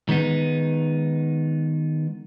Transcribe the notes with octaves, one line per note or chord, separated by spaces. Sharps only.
D#3 G#3 B3 D#4